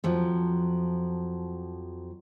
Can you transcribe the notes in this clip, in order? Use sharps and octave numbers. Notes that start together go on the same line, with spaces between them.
F2 F3 F#3